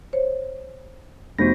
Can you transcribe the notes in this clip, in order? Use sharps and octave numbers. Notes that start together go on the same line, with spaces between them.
C5 C#5
F1 B3 F#4 C5 A#6